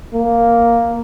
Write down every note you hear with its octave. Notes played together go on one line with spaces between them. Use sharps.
A#3